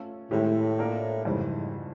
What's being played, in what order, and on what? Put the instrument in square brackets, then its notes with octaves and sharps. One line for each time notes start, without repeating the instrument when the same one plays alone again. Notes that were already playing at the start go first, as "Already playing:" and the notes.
Already playing: [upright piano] A3 C#4 F4 A4
[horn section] A2 [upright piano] D#3 G#3 C4 E4 G4
[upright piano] A#3 D4 F4 A#4
[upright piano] F2 C#3 E3 G3 [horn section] G#2